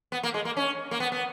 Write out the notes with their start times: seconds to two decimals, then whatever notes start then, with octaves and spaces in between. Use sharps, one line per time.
0.12 B3
0.23 A#3
0.34 G#3
0.45 A#3
0.57 C#4
0.91 A#3
1.00 B3
1.12 B3